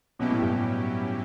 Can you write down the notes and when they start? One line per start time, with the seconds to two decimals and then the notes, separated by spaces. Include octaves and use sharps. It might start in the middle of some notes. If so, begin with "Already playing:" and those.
0.19 B2 F#3 C#4 E4 G4
0.30 A2
0.42 G2
0.52 A2